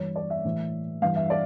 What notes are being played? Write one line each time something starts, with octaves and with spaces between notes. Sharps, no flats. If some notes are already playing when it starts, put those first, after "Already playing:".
Already playing: G2 E3 C#5
D5
E5
A2 E3
G2 E3 F5
E5
D5